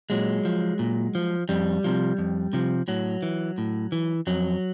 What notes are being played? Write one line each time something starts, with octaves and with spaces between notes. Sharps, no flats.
A#2 F#3 G#3
F3
A#2
F3
F2 G3
C3 F3
F2
C3 F3
A2 F#3
E3
A2
E3
F2 F#3